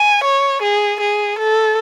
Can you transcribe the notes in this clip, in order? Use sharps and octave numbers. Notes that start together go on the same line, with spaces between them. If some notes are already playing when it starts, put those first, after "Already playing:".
Already playing: G#5
C#5
G#4
G#4
A4